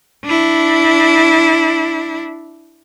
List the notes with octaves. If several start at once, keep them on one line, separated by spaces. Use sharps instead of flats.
D4 E4